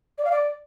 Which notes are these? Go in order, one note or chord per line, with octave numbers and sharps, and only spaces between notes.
D5
F5
D5